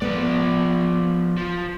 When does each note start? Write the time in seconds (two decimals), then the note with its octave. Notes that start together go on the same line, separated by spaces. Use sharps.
0.02 F3 B3 D5
1.37 F3